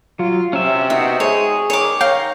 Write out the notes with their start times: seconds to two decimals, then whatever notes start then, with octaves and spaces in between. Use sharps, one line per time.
0.19 F#3 F4
0.53 C3 C#4 E5
0.90 B3 D#4 F#4 E5
1.20 G#3 G#4 C#5
1.70 D#3 C#5 D6
2.01 C#5 F5 G5 A#5